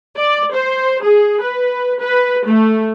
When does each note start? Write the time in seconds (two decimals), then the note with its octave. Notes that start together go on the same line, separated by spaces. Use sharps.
0.17 D5
0.54 C5
1.03 G#4
1.42 B4
2.02 B4
2.46 A3